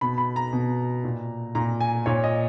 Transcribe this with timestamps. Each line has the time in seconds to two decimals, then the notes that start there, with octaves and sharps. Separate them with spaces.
0.01 B2 B5
0.18 B5
0.36 A#5
0.53 B2
1.04 A#2
1.55 A#2 A#5
1.81 G#5
2.06 A#2 C#5
2.24 D#5